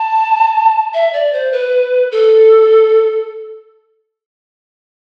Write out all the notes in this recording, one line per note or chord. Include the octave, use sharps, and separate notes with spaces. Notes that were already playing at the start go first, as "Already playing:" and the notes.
Already playing: A5
E5
D5
C5
B4
A4